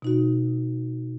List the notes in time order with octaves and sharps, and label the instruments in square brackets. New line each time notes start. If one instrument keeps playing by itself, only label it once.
[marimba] B2 D#4 F#4